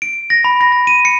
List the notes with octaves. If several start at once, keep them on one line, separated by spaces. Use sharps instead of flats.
D7
A#6
B5
A#6
A#6
D#7
C#7